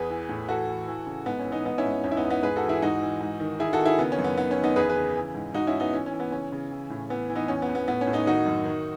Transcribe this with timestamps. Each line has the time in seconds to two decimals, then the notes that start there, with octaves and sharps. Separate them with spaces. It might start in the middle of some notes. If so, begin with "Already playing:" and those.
Already playing: E2 G#4 B4
0.10 E3
0.29 A2
0.49 E3 F#4 A4
0.68 E3
0.87 E3
1.06 C#3
1.26 G#2 B3
1.39 C#4
1.45 E3
1.52 B3 D#4
1.65 G#2 B3 D#4
1.78 C#4 E4
1.85 G#2
2.04 E2 C#4
2.11 E4
2.17 B3 D#4
2.23 E2
2.30 B3 D#4
2.43 G#2 G#4 B4
2.56 F#4 A4
2.62 E3
2.69 E4 G#4
2.82 G#2 D#4 F#4
3.02 E3
3.21 G#2
3.40 D#3
3.60 D#3 E4 G#4
3.73 F#4 A4
3.79 D#3
3.85 E4 G#4
3.98 C#3 B3
4.12 C#4
4.19 F#2
4.24 B3
4.37 D#3 B3
4.51 C#4
4.57 D#3
4.64 B3 D#4
4.76 E2 G#4 B4
4.89 G#4 B4
4.96 C#3
5.16 E3
5.35 G#2
5.54 G#2 D#4 F#4
5.67 C#4 E4
5.74 G#2
5.80 B3 D#4
5.93 E3 C#4
6.06 C#4
6.12 E3
6.20 B3
6.32 C#3 C#4
6.52 C#3
6.72 E3
6.90 A2
7.10 E3 B3
7.30 E3
7.35 B3 D#4
7.48 E2 C#4
7.62 B3
7.68 E2
7.75 B3
7.88 A2 B3
8.01 C#4
8.07 A2
8.13 B3 D#4
8.26 D#3 D#4 F#4
8.46 F#2
8.65 D#3